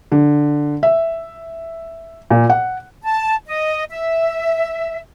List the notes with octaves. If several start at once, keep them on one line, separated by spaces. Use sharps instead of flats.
D3
E5
A#2
F#5
A5
D#5
E5